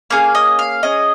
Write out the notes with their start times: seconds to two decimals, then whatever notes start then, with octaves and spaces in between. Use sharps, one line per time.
0.10 A#3 C#4 G#4 F5
0.35 D#5
0.59 F5
0.83 C#4 G#4 D#5